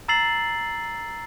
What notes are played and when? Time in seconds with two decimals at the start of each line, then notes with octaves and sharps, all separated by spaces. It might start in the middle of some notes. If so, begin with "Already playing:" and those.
0.08 A#5 E6 A6 C7 F#7